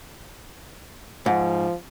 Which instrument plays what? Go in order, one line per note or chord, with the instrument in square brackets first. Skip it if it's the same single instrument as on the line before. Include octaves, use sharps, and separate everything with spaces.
[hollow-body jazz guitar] G#2 [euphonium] F3